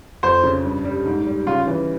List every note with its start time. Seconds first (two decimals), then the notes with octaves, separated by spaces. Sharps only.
0.23 F2 C5
0.44 C#3
0.64 G2
0.84 G3
1.05 G#2
1.26 G3
1.47 C#3 F4
1.67 E3